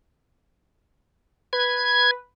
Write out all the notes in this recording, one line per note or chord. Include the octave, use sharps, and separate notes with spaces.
B4 G#6